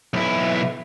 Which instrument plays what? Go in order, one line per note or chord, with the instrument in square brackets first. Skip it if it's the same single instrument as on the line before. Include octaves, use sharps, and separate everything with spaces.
[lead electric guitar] B1 E4